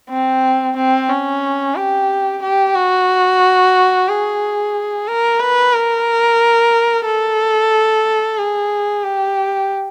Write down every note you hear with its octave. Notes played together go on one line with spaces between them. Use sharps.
C4
C4
C#4
G4
G4
F#4
G#4
A#4
B4
A#4
A4
G#4
G4